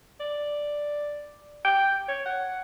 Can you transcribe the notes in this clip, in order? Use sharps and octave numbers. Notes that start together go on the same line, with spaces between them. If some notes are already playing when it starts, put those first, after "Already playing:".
D5
G5
C#5
F#5